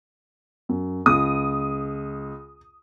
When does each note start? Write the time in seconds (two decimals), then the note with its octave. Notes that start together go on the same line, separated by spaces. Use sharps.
0.69 F#2
1.06 C#2 D#6